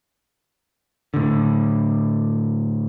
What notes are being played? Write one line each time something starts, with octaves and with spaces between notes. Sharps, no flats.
A2 D3